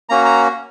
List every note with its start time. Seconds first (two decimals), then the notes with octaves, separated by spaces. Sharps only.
0.09 A#3 C#4 F#4 A#5
0.25 A#5